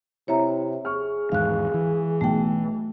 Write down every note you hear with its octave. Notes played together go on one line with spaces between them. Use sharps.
C3 E4 C#5 E5 A#5
G#4 C#6 F6
E2 G#2 D#3 F5 F#6
E3
B1 A3 G5